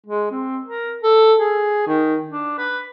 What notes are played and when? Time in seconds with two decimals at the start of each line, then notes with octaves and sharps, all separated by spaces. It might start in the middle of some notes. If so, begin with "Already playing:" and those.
0.06 G#3
0.31 C4
0.65 A#4
1.03 A4
1.38 G#4
1.87 D#3
2.29 D4
2.58 B4